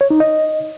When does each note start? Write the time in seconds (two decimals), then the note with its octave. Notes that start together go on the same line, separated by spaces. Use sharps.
0.01 C#5
0.10 D#4
0.20 D#5